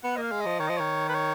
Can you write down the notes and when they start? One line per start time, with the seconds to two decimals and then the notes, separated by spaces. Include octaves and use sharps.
0.04 B3 F#5
0.16 A#3 D#5
0.22 F5
0.31 G#3
0.41 F3 D#5
0.59 D#3 C#5
0.68 F3 D#5
0.77 D#3 C#5
1.09 B4
1.14 C#5